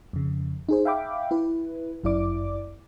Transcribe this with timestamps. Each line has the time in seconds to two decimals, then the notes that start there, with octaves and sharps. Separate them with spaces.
0.13 F2 C#3
0.69 D#4 G#4 C5
0.85 E5 F5 G5 B5 D6
1.31 E4 B4
2.04 G1 F#2 E4 D5 D6